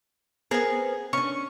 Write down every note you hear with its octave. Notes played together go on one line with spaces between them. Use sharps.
B3 C4 G#4 A#4 G#5
C#4 D4 C#6